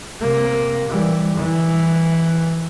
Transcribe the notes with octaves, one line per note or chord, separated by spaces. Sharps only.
C3 A#3
E3 G3
E3